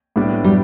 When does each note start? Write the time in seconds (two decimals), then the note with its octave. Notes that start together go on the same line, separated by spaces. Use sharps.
0.16 A2 G3 B3 D4
0.44 G3